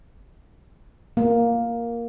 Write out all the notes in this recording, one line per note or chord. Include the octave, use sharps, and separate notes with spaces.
A#3